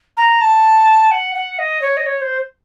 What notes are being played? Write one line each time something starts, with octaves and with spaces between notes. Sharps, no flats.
A#5
A5
F#5
F#5
D#5
C#5
D#5
C#5
C5